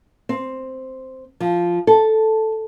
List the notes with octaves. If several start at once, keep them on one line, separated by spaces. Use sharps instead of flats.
C4
F3
A4